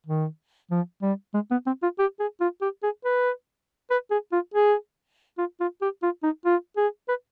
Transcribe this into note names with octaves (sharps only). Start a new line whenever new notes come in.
D#3
F3
G3
G#3
B3
C4
F4
G4
G#4
F4
G4
G#4
B4
B4
G#4
F4
G#4
F4
F4
G4
F4
D#4
F4
G#4
B4